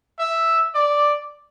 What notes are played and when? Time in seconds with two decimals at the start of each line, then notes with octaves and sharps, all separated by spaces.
0.19 E5
0.75 D5